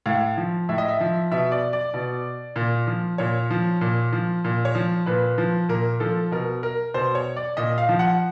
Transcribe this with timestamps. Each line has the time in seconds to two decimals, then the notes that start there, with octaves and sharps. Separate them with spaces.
0.06 A2 F5
0.37 F3
0.69 A2 E5
0.78 D#5
0.88 E5
1.00 F3
1.31 B2 E5
1.52 D5
1.73 D5
1.94 B2
2.56 A#2
2.87 F3
3.18 A#2 C#5
3.50 F3
3.81 A#2
4.13 F3
4.44 A#2
4.65 C#5
4.75 F3
5.06 A#2 B4
5.38 F3
5.69 A#2 A#4
6.00 F3 A4
6.31 B2 A#4
6.63 A#4
6.94 B2 C5
7.15 C#5
7.36 D5
7.57 A#2 D#5
7.78 F5
7.89 F3
7.99 F#5